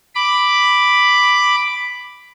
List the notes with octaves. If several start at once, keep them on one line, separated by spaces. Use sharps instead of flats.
B5 D6